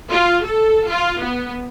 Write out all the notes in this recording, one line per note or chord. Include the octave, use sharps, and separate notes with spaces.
F4
A4
F4
B3